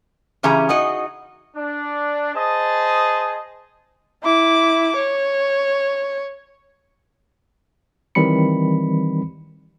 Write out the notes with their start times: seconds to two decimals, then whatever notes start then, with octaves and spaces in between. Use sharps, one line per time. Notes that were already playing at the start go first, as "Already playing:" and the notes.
0.43 C#3 E3 C#4 G4 G#4 A#5
0.69 D#4 F#4 G#4 D#5
1.56 D4
2.34 G#4 C5 D#5 A5
4.23 E4 D6
4.96 C#5
8.15 D#3 E3 G3 C4 B5 C#7